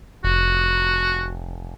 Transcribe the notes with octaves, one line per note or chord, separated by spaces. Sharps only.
F1 F#4